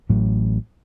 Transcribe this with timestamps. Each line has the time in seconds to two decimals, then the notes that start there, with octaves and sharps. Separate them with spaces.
0.10 A1 A2 F#3